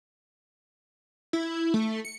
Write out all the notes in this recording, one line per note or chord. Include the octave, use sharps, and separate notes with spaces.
E4
A3
C#7